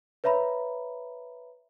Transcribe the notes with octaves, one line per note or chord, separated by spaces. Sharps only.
B4 C#5 E5 A#5 B5